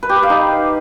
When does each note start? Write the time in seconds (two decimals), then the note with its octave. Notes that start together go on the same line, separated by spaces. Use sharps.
0.03 B4
0.09 G4
0.16 B4
0.23 F5
0.30 D#4